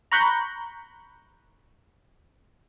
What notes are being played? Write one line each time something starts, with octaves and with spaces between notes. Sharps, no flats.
A#5 B5 C#6 F#6 G6